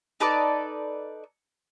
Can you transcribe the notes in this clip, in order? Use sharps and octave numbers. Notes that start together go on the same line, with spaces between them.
D#4 A4 B4 D5